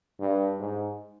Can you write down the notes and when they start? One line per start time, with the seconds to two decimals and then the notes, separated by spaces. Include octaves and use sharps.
0.20 G2
0.60 G#2